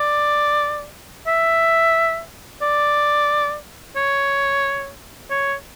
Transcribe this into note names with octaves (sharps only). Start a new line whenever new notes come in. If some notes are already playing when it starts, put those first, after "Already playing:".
Already playing: D5
E5
D5
C#5
C#5